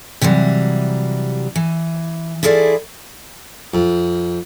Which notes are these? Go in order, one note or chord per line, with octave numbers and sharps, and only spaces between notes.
C3 E3 F#3 G3
E3
E4 F4 G#4 A4 D5
F2